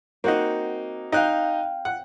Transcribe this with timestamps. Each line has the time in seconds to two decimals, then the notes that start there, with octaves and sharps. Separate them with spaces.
0.24 A#3 C4 D#4 F#4 F#5
1.12 D#4 F5 G5 F#6
1.85 F#5